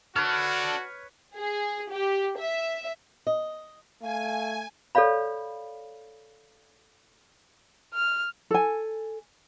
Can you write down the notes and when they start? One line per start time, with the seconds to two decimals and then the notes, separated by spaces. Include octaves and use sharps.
0.16 D4 F#4 A4 B4 C#5 F6
1.36 G#4
1.91 G4
2.37 E5
3.27 D#5
4.02 A3 F5 G#5
4.95 A4 C#5 D5 F5 B5
7.94 F6
8.51 A4 G#5